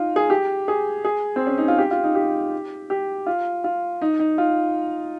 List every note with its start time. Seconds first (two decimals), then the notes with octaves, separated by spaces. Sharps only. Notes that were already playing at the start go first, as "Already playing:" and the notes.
Already playing: D#4 F4
0.16 G#4
0.30 G4
0.68 G#4
1.05 G#4
1.36 C4
1.47 C#4
1.58 D#4
1.68 F4
1.78 G4
1.91 F4
2.04 D#4
2.15 G4
2.90 G4
3.26 F4
3.64 F4
4.02 D#4
4.20 D#4
4.38 F4